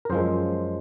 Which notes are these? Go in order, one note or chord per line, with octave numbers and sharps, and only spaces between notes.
A#4
F#2 F3 G#3 C5